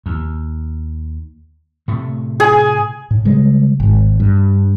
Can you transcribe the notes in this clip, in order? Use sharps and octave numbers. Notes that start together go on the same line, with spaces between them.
D#2
A2 C3 A3
G#4
A2
C#3 G3 G#3
G#1 G#2
G2